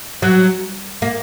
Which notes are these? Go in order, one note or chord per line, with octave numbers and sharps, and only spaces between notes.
F#3
A#3